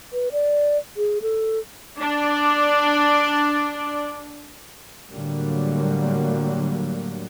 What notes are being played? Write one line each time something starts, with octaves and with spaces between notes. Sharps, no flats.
B4
D5
G#4
A4
D4 D5
A2 D3 F#3 G3 A#3